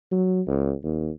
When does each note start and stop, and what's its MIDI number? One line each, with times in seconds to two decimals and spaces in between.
0.11 0.41 54
0.47 0.73 37
0.83 1.10 39